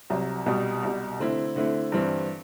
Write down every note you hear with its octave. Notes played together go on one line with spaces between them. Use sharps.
C2 C3 F#3
C2 B2 G3
C2 B2 G3
D3 A3 C4 E4
D3 A3 C4 E4
G2 E3 G3 C4